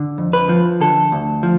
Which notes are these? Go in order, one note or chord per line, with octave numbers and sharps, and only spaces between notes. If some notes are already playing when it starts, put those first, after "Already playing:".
Already playing: D3
F2
B4
F3
D3 A4
D2
F3